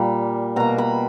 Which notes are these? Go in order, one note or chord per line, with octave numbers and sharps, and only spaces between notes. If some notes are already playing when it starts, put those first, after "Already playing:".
Already playing: A#2 G3 A#3
B2 A#3 A#5
B5